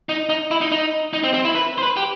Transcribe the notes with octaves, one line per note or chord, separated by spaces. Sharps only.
D#4
D#4
E4
D#4
D#4
D#4
C4
C4
E4
B4
C5
B4
G4